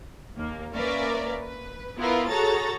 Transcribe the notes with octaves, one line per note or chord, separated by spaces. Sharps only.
D#2 A#3
A#3 C#4 A#4 B4 D5 E5
B4
B3 E4 F4 A#4 B4
F#4 G#4 A4 C#5 A#5 A6